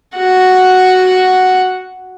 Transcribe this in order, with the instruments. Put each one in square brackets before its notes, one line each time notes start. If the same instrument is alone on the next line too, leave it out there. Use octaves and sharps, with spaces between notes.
[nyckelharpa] F#4 F#5